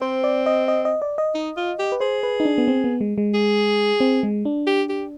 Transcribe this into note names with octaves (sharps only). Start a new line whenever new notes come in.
C4 C5
D5
D#5
D#5
D#5
D5
D#5
D#4
F4
G4
B4
G#4 C5
B4
D#4
D4
B3
C4
B3
G#3
G#3
G#4
C4
G#3
D4
G4
G4